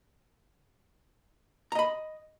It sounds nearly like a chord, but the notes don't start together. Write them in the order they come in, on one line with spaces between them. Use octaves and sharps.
A#5 D#5 B5